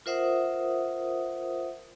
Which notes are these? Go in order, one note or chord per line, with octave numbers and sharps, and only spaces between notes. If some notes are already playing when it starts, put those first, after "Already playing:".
F4 A#4 C5 E5 F#5 D#6